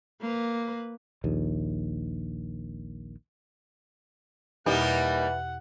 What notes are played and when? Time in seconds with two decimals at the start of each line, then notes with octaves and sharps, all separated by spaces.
0.21 A#3 B4
1.24 A#1 D#2
4.66 E2 B2 E3 G3 A#3 D#4 G4 F#5